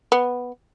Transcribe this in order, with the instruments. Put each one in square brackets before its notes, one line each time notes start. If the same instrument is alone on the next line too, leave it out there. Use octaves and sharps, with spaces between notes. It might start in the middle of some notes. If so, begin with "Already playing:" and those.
[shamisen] B3